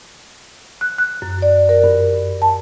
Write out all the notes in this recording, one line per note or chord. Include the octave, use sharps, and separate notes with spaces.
F#6
F#6
F#2
D5
A#4
G2
A5